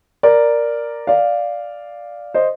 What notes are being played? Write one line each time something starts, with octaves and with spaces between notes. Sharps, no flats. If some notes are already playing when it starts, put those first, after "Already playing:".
A#4 D5
D5 F5
C5 D#5